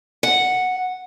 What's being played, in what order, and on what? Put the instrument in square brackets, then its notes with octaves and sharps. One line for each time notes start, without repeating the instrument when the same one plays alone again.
[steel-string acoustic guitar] F#5